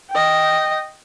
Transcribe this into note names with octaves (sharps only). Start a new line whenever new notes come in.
D#5 G5